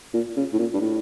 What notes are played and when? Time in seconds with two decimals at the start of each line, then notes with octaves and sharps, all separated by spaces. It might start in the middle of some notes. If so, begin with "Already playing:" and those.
0.14 A#2
0.37 C#3
0.53 A2
0.59 A#2
0.74 G2
0.81 A2